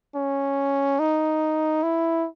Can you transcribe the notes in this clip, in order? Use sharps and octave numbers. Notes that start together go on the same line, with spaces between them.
C#4
D#4
E4